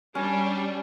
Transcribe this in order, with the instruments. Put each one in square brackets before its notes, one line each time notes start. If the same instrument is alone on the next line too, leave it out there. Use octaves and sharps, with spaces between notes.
[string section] G3 D4 [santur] C#4